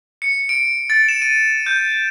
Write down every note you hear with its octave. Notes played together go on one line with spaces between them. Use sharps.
C#7
D7
A6
E7
D#7
G6